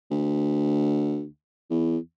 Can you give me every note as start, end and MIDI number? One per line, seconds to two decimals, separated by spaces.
0.11 1.26 38
1.70 1.98 40